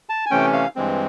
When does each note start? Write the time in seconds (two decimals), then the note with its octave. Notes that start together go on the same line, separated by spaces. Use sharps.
0.09 A5
0.26 G#5
0.31 C3 E3 A3 C#4 G5
0.53 F5
0.76 G2 E3 G#3 C4